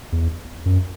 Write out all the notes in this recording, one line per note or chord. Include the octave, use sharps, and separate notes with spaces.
E2
F#2